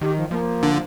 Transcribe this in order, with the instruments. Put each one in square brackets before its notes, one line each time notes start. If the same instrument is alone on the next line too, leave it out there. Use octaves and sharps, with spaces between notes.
[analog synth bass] D#3 [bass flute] G4
[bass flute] F3
[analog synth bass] F3 [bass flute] A#3
[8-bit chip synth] D3